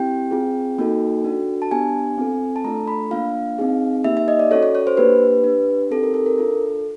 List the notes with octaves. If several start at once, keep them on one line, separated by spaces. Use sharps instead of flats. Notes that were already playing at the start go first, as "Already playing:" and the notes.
Already playing: C4 E4 G4 G5
C4 F4 G#4
A#3 D#4 F#4 A4
D4 F#4 A4
A5
B3 D4 G4 G#5
C4 F4 A4
A5
A3 D4 F4 A4 A#5
B5
A#3 D4 F4 F5
C4 D#4 G#4
A#3 D#4 G4 E5
E5
D#5
D5
C#4 F#4 A4 C#5
C#5
C#5
C5
A#3 D4 G4 B4
D4 G4
C4 D#4 G4 A4
A#4
A4
A#4
D4 F4 A4